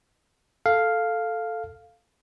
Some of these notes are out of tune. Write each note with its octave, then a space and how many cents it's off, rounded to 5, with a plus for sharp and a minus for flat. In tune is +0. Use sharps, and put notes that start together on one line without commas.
A4 +0 F5 +0